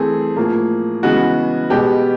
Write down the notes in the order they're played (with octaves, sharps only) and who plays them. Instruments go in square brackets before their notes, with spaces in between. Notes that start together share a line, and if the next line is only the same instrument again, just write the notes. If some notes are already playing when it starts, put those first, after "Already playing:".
Already playing: [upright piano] E3 A3 C4 G#4
A2 F3 A#3
C#3 E3 G#3 B3 F#4
B2 G#3 B3 G4